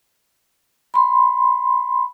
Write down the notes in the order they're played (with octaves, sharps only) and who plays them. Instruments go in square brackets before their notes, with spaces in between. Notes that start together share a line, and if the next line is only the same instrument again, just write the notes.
[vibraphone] B5 C6